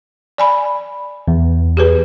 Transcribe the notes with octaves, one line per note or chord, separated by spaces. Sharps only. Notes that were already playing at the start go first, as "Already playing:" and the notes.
D5 G#5 B5
E2
G4 G#4 B4